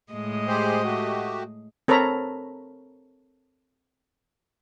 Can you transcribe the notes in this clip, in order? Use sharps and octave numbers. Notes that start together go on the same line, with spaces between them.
A2 G#3 D#5
G4 G#4 C5
A3 F#4 G4
C4 A4 A#4 C#5 A#5 B5